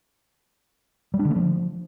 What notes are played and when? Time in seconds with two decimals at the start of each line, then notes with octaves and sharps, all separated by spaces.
1.14 G3
1.19 D4
1.25 D3
1.31 A3
1.36 F3